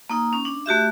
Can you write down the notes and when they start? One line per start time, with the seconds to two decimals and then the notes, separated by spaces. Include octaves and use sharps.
0.10 A#3 D#4
0.33 C#4
0.45 D4
0.66 A3 F#4 G4 E5